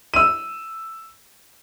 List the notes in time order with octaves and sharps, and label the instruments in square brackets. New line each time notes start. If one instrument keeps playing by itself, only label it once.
[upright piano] E6 D#7